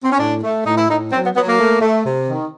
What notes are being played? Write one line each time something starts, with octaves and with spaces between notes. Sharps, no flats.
C4
C#4
A2 D4
A3
A2 D#4
E4
A2 D#4
F#3 C4
B3
F#3 B3
A#3
A3
A3
C3
D#3